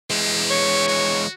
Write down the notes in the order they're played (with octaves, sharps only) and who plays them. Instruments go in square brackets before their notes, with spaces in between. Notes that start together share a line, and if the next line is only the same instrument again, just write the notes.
[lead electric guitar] E3 G#3 [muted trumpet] G4
[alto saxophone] C#5
[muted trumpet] F#4